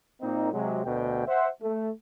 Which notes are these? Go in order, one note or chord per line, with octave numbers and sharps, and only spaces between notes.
A#2 A#3 C4 D#4
C3 F#3 G#3
D2 B2 G5
C5 E5 F#5
A3